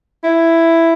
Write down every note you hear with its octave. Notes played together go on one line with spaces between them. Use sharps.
E4